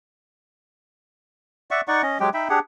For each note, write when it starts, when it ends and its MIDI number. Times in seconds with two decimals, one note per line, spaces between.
1.71 1.81 74
1.71 1.81 76
1.71 1.81 78
1.71 1.81 85
1.88 2.02 63
1.88 2.02 74
1.88 2.02 78
1.88 2.02 85
2.03 2.18 61
2.03 2.18 75
2.20 2.30 54
2.20 2.30 56
2.20 2.30 67
2.20 2.30 79
2.34 2.48 63
2.34 2.48 76
2.34 2.48 79
2.34 2.48 83
2.49 2.59 62
2.49 2.59 67
2.49 2.59 68
2.49 2.59 78